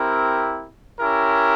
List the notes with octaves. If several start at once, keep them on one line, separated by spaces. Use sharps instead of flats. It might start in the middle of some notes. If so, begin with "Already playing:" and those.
Already playing: C4 E4 G4 A#4
C#4 E4 G4 A#4